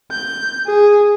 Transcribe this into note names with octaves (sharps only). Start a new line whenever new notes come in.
G6
G#4